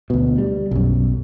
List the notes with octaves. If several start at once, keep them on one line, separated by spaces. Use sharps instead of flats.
D2 B2
G3
B1 F#2